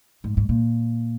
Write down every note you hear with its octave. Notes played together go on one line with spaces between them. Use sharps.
G#2
G#2
A#2